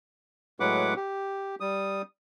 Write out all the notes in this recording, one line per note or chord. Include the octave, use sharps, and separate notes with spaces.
A2 F#3 G#3 B4 F#5 D6
G4
G3 D#6